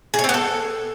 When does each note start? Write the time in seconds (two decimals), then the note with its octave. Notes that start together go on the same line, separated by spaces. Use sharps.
0.14 G#4
0.19 C#5
0.24 C4
0.29 B3
0.34 A4